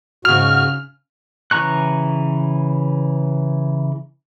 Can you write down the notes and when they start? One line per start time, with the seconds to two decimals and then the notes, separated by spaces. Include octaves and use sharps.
0.25 G#2 C#3 F#4 F6 F7
1.51 C#3 E3 A#5 C#6 F#6